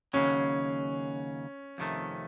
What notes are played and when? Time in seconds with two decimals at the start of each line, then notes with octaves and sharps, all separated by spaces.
0.13 D#2 C#3 F#3 C#4
1.78 F2 C3 D#3 A3